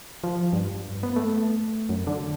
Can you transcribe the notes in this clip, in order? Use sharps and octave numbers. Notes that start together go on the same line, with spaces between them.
F3
G2
B3
A3
F#2
D3